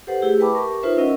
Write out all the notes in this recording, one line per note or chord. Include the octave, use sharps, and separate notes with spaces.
G4 A4 B4 C5 F#5
A3 E4 G4 G#4
B4 E5 G5 A5 B5 D6
G4 A#4 C#6
D#4 F4 B4 C5 E5
C#4 E4 A#4 D#5 F#5